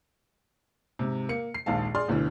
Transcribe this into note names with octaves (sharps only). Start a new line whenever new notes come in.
G#2 C3
A#3 C#7
C7
A#1 D#2 G#3 F5 A5
G#4 D5 C6 F6
A1 D2 B2 D3 E3